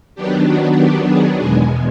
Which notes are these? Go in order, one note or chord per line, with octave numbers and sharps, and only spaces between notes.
D#3 F#3 B3 D4 G4
F#4
G4
G#4
E2 B2 G#3 G#4